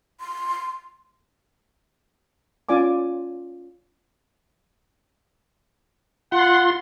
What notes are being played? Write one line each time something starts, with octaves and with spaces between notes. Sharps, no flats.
C6
C#4 F4 D5 G#5 D6
F4 F#5 C6